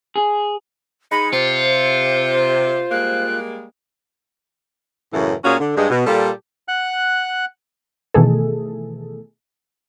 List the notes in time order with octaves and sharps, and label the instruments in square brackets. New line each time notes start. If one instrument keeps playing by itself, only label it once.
[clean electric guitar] G#4
[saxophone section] G#3 D#4 [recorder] B5 [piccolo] C#7
[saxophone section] C3 [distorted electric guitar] F4 [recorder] C5
[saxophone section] G3 G#3 A#3 [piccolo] F#6
[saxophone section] F#2 A2 C#3 E3
A#2 C#4 F#4 G#4 C#5 F5
D3
G2 G#3
B2
A#2 G3 F4 G4 A4
[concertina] F#5 F#6
[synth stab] B2 D#3 E3 A3 G#4 A4